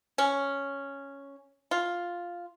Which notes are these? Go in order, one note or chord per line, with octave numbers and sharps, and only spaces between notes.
C#4
F4